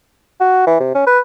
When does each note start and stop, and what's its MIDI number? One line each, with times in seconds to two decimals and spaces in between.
0.41 0.65 66
0.67 0.76 52
0.80 0.91 48
0.95 1.05 61
1.07 1.19 71